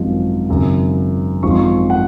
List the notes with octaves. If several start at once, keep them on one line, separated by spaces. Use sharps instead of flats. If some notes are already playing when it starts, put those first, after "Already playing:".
Already playing: G#1 F#2 F3 G#3
G#1 F#2 C#3
G#1 F#2 F3 G#3 C#6
C6
C#6
F#5